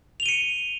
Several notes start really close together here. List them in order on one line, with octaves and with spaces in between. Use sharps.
F7 G7 D#7 C#7